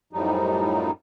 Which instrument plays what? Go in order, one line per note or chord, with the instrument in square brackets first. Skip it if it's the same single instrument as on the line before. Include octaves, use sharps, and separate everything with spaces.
[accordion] F#2 A2 F3 G3 D#4